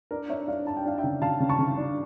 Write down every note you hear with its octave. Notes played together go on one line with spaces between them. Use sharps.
D4 A#4 D5
D4 C#5 E5
D4 D5 F5
D4 A5
G5
D4 F5
E5 G5
C#3
C#3 F5 A5
C#3
A5 C#6
C#3
D4